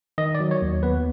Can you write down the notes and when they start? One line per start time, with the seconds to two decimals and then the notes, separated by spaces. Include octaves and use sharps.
0.18 D#3 D#5
0.35 D5
0.40 F#3
0.51 C#5
0.62 D#2
0.83 B3 B4